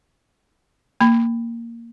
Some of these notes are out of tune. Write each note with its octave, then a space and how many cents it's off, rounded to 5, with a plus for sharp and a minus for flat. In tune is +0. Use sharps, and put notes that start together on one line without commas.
A#3 -5 B5 +20